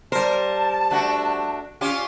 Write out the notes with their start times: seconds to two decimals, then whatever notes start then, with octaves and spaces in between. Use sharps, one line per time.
0.12 G3 A#4 C5 A5
0.91 A3 D4 F#4
1.81 C#4 F4 G4